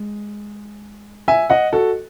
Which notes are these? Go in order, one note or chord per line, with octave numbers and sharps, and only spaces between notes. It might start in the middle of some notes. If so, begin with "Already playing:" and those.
Already playing: G#3
E5 G#5
D#5 F#5
F#4 A4